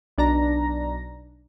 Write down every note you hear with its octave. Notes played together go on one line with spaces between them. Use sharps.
B1 D4 A#5 A#6